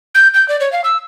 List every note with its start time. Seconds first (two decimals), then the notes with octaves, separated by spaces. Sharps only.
0.15 G6
0.34 G6
0.49 D5
0.60 C#5
0.72 F5
0.84 E6